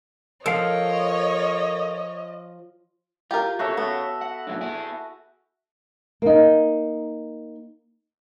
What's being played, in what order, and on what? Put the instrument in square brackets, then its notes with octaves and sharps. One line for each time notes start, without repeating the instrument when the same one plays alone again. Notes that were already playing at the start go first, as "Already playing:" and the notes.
[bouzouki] F3 [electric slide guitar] A4 A#4 F5 [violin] C#5 [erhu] D#5
[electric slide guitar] F4 [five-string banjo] G4 A#4
[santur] F#4 A4 E5 [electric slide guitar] G#4 C#5
[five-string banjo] B3
[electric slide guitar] F#5
A#2 F#3 D4
E4 G#4
[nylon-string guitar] A#3 D#4